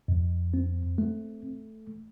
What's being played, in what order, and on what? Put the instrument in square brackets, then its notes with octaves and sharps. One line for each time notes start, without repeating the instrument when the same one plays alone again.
[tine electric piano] F2
C4
A3